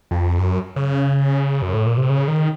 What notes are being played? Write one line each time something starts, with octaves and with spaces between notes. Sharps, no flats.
F2
F#2
C#3
F#2
A2
A#2
C3
C#3
D#3